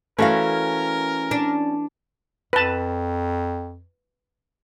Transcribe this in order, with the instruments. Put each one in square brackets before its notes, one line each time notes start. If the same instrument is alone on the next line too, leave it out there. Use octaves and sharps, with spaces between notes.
[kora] E3 A3 [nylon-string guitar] C#4 F#4 F5 [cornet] A#4
[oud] D4
[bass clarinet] F2 [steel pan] B4 A5